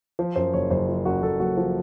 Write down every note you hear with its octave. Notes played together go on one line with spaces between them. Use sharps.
F3 C5
F#2 C5
F#1 C#5
F#1 C5
F3
F#2 F#4
F#1 A4
F#1 F#4
F3